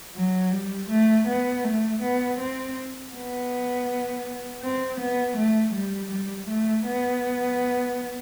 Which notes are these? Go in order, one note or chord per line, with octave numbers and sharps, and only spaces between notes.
F#3
G3
A3
B3
A3
B3
C4
B3
C4
B3
A3
G3
G3
A3
B3